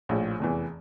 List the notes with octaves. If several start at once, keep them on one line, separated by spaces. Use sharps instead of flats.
A#1 A2 F3
F1 E2 E3